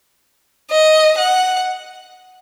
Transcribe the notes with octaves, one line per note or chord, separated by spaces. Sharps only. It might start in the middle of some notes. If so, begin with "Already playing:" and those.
D#5
F#5